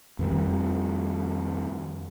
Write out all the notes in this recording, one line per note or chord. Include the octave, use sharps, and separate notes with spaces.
F2 D#3 G3